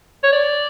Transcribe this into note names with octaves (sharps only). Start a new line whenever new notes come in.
C#5
D5